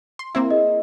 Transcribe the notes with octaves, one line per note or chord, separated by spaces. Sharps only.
C6
A#3 C4 E4
G#4 D#5